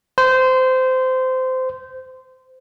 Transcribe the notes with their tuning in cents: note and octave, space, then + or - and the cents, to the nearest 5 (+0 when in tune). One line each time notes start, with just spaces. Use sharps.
C5 -20